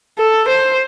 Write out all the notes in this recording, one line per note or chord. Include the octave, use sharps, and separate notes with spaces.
A4
C5